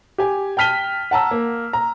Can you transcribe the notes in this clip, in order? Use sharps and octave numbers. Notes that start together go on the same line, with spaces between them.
G4 G#5
G5 A5 F6 B6 D#7 G7
F#5 A5 A#5 E6
A#3
A#5